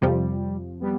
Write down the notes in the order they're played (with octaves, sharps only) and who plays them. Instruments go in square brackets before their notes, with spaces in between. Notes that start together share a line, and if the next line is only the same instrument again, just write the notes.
[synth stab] F2 C3 F3 [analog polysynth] G3
[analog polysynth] G3 B3